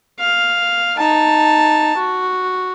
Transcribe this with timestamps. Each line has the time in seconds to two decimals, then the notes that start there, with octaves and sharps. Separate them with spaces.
0.20 F5
0.97 D#4 A5
1.97 F#4